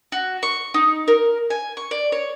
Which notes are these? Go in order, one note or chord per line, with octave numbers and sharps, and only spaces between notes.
F#4
C#6
D#4
A#4
G#5
C#6
D5
C#5